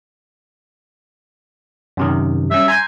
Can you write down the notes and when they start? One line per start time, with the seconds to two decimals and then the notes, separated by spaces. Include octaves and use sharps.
1.97 F#2 C3 D#3
2.51 G3 C#4 E5
2.68 G#5 A#5 C6 G6